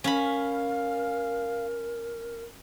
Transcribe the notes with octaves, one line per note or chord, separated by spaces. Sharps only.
C#4 A#4 F5 B5